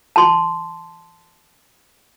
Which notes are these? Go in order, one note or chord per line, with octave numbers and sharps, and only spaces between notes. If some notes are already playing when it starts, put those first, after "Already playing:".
A5 C6